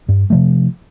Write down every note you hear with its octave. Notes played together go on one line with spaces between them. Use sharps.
G2
C3 F3 A3